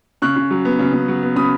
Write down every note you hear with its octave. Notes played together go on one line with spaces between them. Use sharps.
C#3 C#6 F#6
C#3
F#3
B3
C#3
C#3
F#3
B3
C#3 B5 D#6